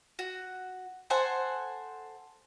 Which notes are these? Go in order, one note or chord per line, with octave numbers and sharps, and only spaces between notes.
F#4
A4 C5 F#5 G#5